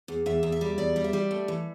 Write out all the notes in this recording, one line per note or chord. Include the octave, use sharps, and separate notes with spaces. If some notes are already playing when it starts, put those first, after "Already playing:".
E2
E2 E5
E2
E5
G3
E2 D5
G3
E5
G3
A3
E3